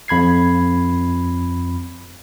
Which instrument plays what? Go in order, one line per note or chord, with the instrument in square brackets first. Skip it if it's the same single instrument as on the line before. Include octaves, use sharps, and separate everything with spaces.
[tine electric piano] F2 B5 G#6 C7